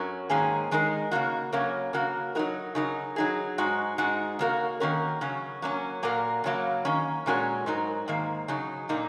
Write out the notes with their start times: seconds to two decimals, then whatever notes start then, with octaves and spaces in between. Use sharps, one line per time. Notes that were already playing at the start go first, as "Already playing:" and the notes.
Already playing: F#2 F#3 C#4 A#4
0.30 G#2 D#3 A#3 C#4 G#4
0.71 D#3 G#3 D#4 A#4
1.11 C#3 A#3 F#4
1.53 C#3 F#3 A#3 C#4 A#4
1.93 C#3 A#3 F#4 A#4
2.35 F#3 D#4 F#4 A#4
2.75 C#3 F#3 D#4 A#4
3.16 F#3 D#4 G#4
3.58 G#2 G#3 D#4 F#4
3.98 G#2 G#3 D#4 F#4
4.39 C#3 A#3 F#4 A#4
4.80 D#3 A#3 C#4 F#4 A#4
5.21 C#3 F#3 C#4
5.62 F#3 A#3 C#4
6.03 A#2 A#3 F#4 A#4
6.44 C#3 F#3 A#3
6.85 D#3 A#3 C#4
7.26 A#2 G#3 C#4 F#4 A#4
7.66 G#2 F#3 D#4 A#4
8.08 G#2 D#3 A#3
8.48 C#3 F#3 D#4
8.89 A#2 A#3 D#4